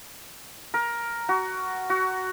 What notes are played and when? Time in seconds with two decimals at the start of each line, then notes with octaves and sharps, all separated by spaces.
0.74 A#4
1.29 F#4
1.90 F#4